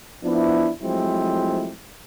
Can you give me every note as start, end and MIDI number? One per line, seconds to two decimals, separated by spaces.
0.24 0.71 53
0.24 0.71 59
0.24 0.71 62
0.24 0.71 64
0.82 1.73 53
0.82 1.73 54
0.82 1.73 56
0.82 1.73 57
0.82 1.73 60
0.82 1.73 64